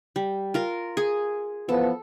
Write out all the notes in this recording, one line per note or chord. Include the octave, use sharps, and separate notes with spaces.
G3
F4 A#4
G#4
E3 F3 B3 A4